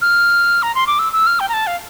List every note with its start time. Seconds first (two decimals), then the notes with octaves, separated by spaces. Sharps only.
0.02 F6
0.63 A#5
0.75 C6
0.87 D6
0.99 E6
1.13 E6
1.27 F6
1.40 G5
1.49 A#5
1.54 A5
1.67 F5